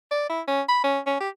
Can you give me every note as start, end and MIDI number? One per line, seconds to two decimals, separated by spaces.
0.11 0.28 74
0.29 0.41 64
0.48 0.62 61
0.69 0.79 83
0.84 0.99 61
1.07 1.17 61
1.20 1.29 67